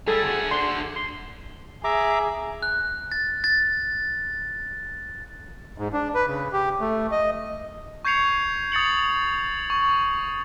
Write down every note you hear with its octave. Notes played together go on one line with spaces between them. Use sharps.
G3 G#4 A4
D3 F#4
D4 C6
C6
G#4 E5 A#5 D6
F#6
A6
A6
G#2
D4
B4
C#3
G4
A3
D#5
C#6 G6 G#6 C7 C#7 F7
D#6 A6 C#7 F#7
C#6